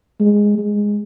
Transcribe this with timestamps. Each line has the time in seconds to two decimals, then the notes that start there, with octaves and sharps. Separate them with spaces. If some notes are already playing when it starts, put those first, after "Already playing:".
0.20 G#3
0.58 G#3